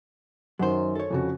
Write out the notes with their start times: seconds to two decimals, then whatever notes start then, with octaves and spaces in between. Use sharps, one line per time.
0.59 F#2 D#3 F#3 C5
0.95 A4 C#5
1.10 F2 C#3 F#4